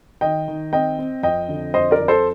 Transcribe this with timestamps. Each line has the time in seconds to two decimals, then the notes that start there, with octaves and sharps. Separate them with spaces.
0.21 D#3 D#5 G5
0.48 D#3
0.73 C4 D#5 G5
0.99 C4
1.23 F2 D#5 G5
1.49 D3
1.74 F2 C5 D#5
1.91 A#4 D5
2.00 F2
2.08 A4 C5